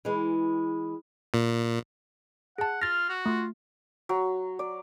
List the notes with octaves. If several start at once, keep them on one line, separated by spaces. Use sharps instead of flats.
E3 G#3
A#2
G#4 F#5 A5
F4 F6 A6 A#6
F#4
A3 F4
F#3
D5